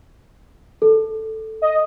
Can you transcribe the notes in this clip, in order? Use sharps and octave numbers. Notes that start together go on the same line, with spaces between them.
A4
D#5